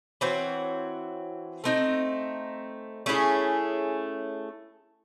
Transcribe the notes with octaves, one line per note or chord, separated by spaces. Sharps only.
E3 C4 F#4 C#5
A3 C4 D#4
A3 C#4 E4 G#4